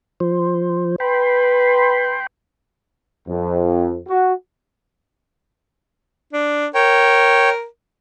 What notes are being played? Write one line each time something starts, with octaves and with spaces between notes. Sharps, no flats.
F3 C5
B4 G5 B5 C6
F2
F#4
D4
A#4 C#5 G5